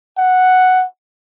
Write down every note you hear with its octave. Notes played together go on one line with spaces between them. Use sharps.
F#5